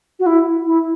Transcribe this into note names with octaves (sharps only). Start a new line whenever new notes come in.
F#4
E4
E4